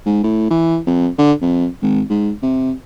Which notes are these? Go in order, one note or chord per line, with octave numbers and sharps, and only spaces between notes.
G#2
A2
E3
F2
D3
F2
G#1
G#2
C3